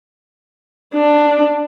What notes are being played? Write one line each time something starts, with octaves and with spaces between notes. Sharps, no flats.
D4